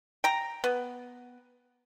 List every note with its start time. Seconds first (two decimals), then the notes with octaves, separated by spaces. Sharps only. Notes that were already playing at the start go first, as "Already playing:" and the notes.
0.24 G5 A#5
0.64 B3